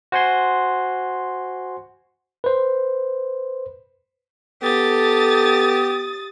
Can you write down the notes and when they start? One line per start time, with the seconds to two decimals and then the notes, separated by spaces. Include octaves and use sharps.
0.12 F#4 C5 F#5 G#5 C6
2.44 B4 C5
4.63 B3 G4 A4 D#6 A6